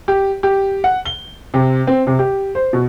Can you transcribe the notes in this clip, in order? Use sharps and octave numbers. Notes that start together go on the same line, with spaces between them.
G4
G4
F#5
G7
C3
C4
C3
G4
C5
B2